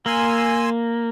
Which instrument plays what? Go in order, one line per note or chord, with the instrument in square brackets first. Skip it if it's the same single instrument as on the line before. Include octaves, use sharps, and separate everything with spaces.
[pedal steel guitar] A#3 [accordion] G#5 C6 E6